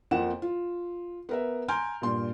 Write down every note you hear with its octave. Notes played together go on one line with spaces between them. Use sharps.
F2 F3 A#3 F#5 E7
F4
B3 A#4 E5
G#5 A#5 C6 F6 G6 D7
G2 A#2 C6